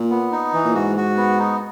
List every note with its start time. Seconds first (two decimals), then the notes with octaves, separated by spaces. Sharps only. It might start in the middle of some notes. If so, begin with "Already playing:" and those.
Already playing: A#2
0.10 B3
0.32 D#4
0.54 E3
0.64 A#2
0.74 G#2 F#4
0.97 F#4
1.17 B3
1.39 D#4